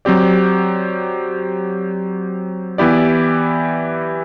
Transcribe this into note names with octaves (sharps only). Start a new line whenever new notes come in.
F#3 C4 G4 D5
E3 B3 E4 G4 D5